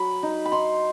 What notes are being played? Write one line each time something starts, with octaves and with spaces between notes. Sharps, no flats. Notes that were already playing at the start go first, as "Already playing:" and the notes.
Already playing: F#3 B5
D#4
B5
D#4 C6